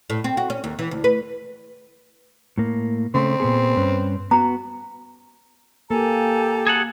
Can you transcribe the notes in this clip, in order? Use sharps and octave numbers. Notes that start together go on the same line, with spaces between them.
A2
C4
F#4
C#4
D#2
E3
D2
B4
A2 A#3
C#3 A3 C4
A#2 B3 G#4
G2 C#4 B4
B3 F#4 A#5
A#3 G4 A4 G#5 A#5
G#4 A4 F#5